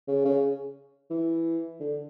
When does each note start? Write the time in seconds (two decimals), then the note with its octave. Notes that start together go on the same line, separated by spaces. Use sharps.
0.08 C#3
0.25 C#3
1.10 E3
1.80 D3